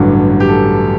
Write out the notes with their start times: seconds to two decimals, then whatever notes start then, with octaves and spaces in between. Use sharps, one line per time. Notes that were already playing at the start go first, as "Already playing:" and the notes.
Already playing: A1 G2 D3 F#3
0.40 G4
0.48 A4